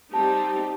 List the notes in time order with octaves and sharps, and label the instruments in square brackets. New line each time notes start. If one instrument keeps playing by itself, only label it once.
[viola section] G3 C4 D#4 G4 [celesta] A5